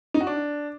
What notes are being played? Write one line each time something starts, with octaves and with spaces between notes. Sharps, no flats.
D#4
F#4
D4